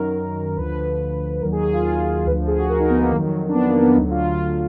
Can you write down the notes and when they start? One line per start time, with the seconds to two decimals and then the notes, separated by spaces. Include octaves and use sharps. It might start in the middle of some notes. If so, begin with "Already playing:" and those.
Already playing: F#2 D#3 F#3 A#4
0.57 D2 D3 F3 B4
1.41 D#2 D#3 F#3 A#4
1.52 G#4
1.63 G#4
1.73 F4
2.26 D2 D3 F3 B4
2.47 G#4
2.58 F#4
2.69 A#4
2.80 D#4
2.90 B3
3.00 A#3
3.11 F2 D#3 F#3
3.49 D4
3.54 B3
3.67 A#3
3.82 B3
3.96 D2 D3 F#3 D#4
4.10 F4
4.24 F4